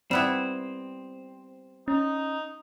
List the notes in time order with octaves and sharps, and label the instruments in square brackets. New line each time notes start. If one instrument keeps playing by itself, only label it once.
[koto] G3 B3 E4 [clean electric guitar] C4
[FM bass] C#4 [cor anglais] D#4